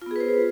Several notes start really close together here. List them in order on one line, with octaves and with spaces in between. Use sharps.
F4 B3 G#4 B4 C5